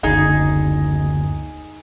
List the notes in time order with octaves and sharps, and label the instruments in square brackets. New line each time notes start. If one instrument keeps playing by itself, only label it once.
[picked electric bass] F#1 D2 [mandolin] D#4 G#4